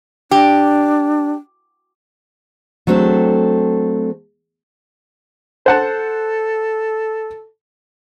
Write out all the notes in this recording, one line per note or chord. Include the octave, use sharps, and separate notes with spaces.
D4 G4
F#3 A3 C4 D4 A4
A4 C5 F#5 A5